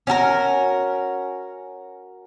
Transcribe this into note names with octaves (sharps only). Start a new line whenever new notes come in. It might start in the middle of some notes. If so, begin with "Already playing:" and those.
C#4 F#4 A4 A#4